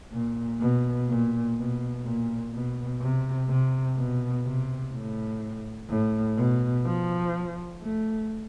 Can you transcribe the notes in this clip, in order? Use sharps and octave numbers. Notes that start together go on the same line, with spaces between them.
A#2
B2
A#2
B2
A#2
B2
C3
C3
B2
C3
A2
A2
B2
F3
A3